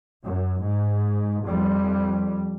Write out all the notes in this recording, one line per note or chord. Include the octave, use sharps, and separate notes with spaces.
F#2
G#2
F2 G3